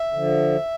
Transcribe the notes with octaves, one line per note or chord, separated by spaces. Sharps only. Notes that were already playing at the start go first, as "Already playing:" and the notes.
Already playing: E5
D3 F3